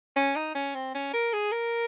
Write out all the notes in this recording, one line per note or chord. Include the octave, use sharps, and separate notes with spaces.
C#4
D#4
C#4
C4
C#4
A#4
G#4
A#4